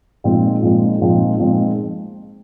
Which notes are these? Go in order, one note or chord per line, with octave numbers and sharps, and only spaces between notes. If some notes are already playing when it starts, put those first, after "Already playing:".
A#2 F3 G#3 C4 D#4
A#2 F3 G#3 C4 D#4
A#2 F3 G#3 C4 D#4
A#2 F3 G#3 C4 D#4